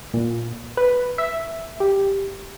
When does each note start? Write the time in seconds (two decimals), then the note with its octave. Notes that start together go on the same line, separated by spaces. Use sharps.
0.14 A#2
0.77 B4
1.18 E5
1.80 G4